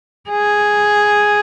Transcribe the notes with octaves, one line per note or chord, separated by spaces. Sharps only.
G#4